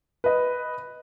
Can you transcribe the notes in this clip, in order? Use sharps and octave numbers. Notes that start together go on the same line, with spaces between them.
B4 D#5